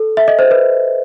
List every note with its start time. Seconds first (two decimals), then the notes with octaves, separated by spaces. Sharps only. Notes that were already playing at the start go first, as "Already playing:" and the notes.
Already playing: A4
0.17 E5
0.28 D#5
0.39 C5
0.51 B4